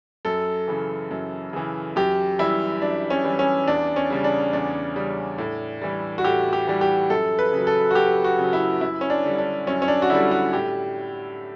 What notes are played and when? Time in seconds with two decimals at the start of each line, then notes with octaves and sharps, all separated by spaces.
0.25 F#2 A4
0.68 C#3 E3
1.11 F#2
1.53 C#3 E3
1.96 F#2 G4
2.39 E3 G3 E4
2.82 F#2 D4
3.10 C#4
3.24 E3 G3
3.39 C#4
3.67 E2 D4
3.96 C#4
4.10 C#3 G3
4.24 D4
4.53 E2 D4
4.96 C#3 G3
5.38 A2
5.82 E3 G3
6.18 F#4
6.24 A2 G4
6.53 G4
6.67 E3 G3
6.81 G4
7.10 F#2 A4
7.39 B4
7.52 C#3
7.58 F#3
7.67 A4
7.91 F#4
7.95 F#2 G4
8.24 F#4
8.39 C#3 F#3
8.53 E4
8.81 F#2 E4
9.01 C#4
9.10 D4
9.24 D3 G3
9.38 D4
9.67 F#2 C#4
9.82 C#4
9.88 D4
10.02 F#4
10.09 D3 G3 E4
10.31 F#4
10.53 A2 G4